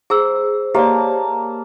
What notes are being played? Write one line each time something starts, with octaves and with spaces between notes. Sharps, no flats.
G#4 C5 A#5 E6
A#3 G4 C#5 D5 A5